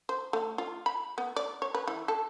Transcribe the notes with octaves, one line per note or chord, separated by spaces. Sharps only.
C5
A3
F4
B5
B3
D5
C#5
B4
E3
A4